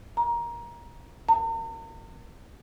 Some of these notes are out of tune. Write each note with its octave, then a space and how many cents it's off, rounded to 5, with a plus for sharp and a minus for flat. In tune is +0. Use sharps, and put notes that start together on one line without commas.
A#5 +15
A#5 -45